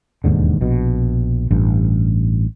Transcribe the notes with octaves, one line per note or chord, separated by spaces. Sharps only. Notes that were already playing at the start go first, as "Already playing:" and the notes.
E1 D#2 G#2 D3
A#1 B2
A1 G2